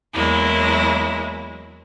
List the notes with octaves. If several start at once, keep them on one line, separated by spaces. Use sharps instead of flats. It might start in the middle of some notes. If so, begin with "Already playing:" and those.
E2 F#3 G#3 A#3 E4